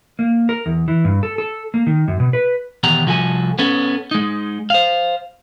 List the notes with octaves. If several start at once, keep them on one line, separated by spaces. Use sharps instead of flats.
A#3
A#4
E2
E3
G2
A4
A4
A#3
D#3
F#2
B2
B4
E2 B2 D#3 G4 F#5 A#5
C2 F3 F#4 A4 G#5
B3 C#4 A4
G#3 D#4
C5 F5